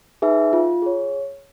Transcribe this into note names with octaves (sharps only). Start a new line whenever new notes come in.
D#4 G#4 B4 E5
F4
G#4 C#5